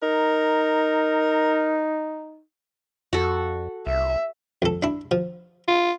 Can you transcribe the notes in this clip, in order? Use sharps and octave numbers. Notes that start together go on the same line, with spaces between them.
D#4 A#4
F2 F#4 A4
C2 E5
F2 A4
D4 E4
F3
F4